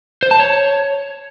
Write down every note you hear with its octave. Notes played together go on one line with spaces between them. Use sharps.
C5
A5
C#5